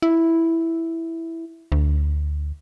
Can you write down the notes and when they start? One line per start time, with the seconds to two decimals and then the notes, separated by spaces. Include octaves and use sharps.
0.02 E4
1.72 D2